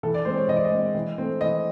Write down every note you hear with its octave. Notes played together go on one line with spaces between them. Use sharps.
E3 A4
D5
G#3 C4 C5
C#5
E3 D#5
D5
D#5
G#3 C4
E3
A3 C4
E3 D#5